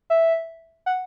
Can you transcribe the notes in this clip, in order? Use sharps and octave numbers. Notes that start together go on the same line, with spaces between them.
E5
F#5